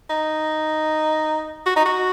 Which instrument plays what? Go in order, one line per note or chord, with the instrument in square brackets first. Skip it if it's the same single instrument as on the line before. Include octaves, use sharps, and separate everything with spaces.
[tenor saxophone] D#4
F#4
D#4
F#4